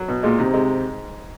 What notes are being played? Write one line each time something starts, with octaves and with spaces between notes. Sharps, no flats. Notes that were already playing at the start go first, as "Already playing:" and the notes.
Already playing: F#3
B2
A#2 G#3
G#2 C3
C3 G#3